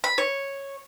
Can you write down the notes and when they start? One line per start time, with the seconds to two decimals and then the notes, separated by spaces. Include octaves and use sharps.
0.04 B5
0.18 C#5